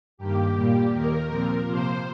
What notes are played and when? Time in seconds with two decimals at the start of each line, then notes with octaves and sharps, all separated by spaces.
0.18 G2 D#3 A#3 G4
0.55 A#2 G3 A#3
0.91 D#2 D#3 A#3 A#4
1.28 A#2 F3 C4
1.65 C3 F3 A#3 C5